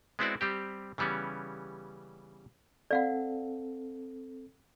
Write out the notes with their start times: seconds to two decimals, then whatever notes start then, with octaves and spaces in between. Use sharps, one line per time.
0.19 G#3 B3 C4 E4 F#4 D5
0.41 G3 C4 G4
0.98 C#3 E3 G3 B3 C#4
2.91 C4 A4 D5 F5 F#5